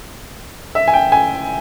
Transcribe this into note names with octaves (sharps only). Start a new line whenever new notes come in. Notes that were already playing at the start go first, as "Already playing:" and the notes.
E5
G#5
G5
G#5